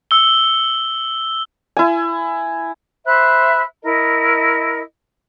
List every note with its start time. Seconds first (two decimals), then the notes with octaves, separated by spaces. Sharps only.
0.11 E6 G7
1.77 E4 G#5
3.05 C5 E5 B5 F#6
3.82 E4 A#4 D#5